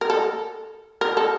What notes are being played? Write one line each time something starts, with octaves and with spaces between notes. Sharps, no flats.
A#4
A4
A#4
A4